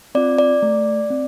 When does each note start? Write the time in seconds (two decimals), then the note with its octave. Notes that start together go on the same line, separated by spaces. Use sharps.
0.15 C4 F4 D5
0.39 D5
0.62 A3
1.10 C4